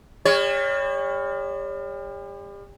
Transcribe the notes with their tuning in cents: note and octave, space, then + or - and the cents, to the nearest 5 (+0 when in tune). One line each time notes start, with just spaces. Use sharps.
G3 +40 C#5 +0